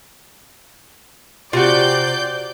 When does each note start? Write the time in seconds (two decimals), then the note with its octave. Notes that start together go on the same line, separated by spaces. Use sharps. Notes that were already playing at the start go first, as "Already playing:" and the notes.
1.53 C3 C4 F4 F#4 D5 G6